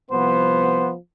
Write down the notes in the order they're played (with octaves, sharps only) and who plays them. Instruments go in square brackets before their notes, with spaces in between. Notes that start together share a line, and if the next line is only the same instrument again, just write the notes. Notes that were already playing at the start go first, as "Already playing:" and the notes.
[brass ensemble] C2 F3 B3 [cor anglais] C5